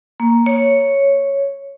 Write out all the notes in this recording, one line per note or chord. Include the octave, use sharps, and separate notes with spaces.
A#3
C#5